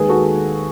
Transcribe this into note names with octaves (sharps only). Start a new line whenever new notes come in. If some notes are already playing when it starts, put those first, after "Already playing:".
Already playing: D#2 D#3 G#3 G#4 B4
F#4 A4